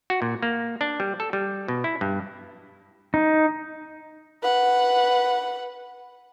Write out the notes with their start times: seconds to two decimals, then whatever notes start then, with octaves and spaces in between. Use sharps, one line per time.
0.10 F#4
0.22 A#2
0.42 A#3
0.81 D4
1.00 G3
1.20 A4
1.33 G3
1.68 B2
1.84 E4
2.01 G2
3.14 D#4
4.43 B4 F#5